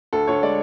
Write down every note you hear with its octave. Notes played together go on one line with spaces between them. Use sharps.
D2 A4
D2 C#5
G#3 D5